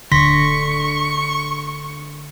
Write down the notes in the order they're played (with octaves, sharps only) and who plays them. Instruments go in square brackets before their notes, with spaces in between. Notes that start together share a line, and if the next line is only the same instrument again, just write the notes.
[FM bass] D1 [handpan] D3 [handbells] C6 A#6 B6 [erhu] C#6